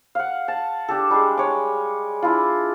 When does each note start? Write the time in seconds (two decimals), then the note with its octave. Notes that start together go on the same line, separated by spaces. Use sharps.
0.15 F5 F#5
0.48 A5
0.88 D4 G4 A4
1.10 G3 G#3 G#4
1.37 C#5 D6
2.22 D4 E4 F4